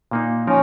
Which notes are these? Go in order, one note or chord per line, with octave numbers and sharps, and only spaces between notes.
A#2 A#3 D#4
F3 C#4 D#4 A#4